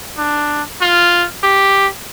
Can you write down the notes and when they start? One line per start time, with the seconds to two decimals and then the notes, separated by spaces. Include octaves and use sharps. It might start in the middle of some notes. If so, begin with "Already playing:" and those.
0.19 D4
0.81 F4
1.44 G4